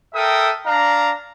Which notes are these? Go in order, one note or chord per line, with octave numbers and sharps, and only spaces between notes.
A4 A#4 E5 G5 D#6
D4 F5 A#5